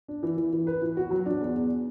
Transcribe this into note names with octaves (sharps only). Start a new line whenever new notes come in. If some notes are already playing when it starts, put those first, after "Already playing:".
D4
E3
E3
E3
B4
E3
F#4
F#3
D4
E2
E2